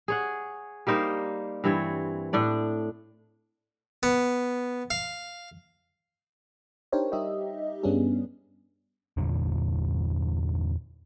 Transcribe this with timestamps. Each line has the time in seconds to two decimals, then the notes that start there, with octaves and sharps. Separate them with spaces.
0.08 G#4 C#5 F#5
0.87 G3 A#3 D#4 C5
1.64 G2 E3 C4 C#5
2.33 A2 D4 D5
4.03 B3
4.90 F5
6.92 D4 D#4 G4 A#4 C5 C#5
7.12 G3 D#4 G4 D#5 E5
7.83 G2 G3 B3 C#4 D4 G#4
9.17 E2 G2 A#2 D3